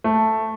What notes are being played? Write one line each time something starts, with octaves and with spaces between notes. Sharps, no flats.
A3